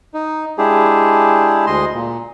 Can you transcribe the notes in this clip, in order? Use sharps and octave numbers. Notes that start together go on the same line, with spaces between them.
D#4
G#3 D4 E4 G4 G#4
D2 G#3 D#5 C6
A#2